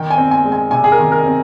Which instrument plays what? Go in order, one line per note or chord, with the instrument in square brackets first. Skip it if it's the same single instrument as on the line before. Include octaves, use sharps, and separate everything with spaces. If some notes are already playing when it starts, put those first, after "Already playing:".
Already playing: [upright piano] D#3 G5
G#5
C4
G#5
G#3
G#5
C3 G#5
G#4
A#4
D#3
A#4
C4